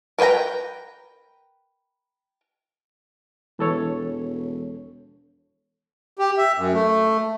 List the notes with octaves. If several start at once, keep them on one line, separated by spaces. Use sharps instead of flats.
A#4 B4 C#5 G5 A#5
E1 E3 A4 C#5
G4
E5
F#2
A3